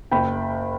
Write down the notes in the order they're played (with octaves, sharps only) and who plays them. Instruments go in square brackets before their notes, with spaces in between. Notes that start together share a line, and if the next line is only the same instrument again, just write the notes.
[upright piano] F#1 G5 B5